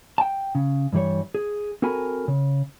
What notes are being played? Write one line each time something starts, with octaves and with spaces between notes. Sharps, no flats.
G5 A5
C#3
G2 E3 G3 C#5
G#4
C4 F#4 A4 A#4 G#5 B5
C#3